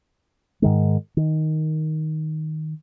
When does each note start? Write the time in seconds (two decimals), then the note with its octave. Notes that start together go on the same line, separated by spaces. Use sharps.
0.62 G#2 D#3 G#3
1.17 D#3